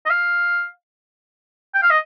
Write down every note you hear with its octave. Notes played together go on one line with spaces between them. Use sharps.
D#5
F5
G5
F5
D#5